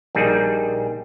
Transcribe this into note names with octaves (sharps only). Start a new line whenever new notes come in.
A#1 G3 D#4 G#4